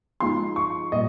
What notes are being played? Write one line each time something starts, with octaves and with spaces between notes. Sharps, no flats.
F3 G#3 D#4 C6
C#6
A#2 G3 D#5